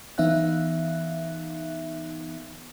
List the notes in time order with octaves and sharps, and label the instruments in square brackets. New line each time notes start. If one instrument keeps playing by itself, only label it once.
[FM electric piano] E3 B3 D#4 E5 F5 F#6